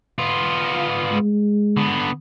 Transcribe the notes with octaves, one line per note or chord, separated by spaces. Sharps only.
B3 F4
G#3
D3 B3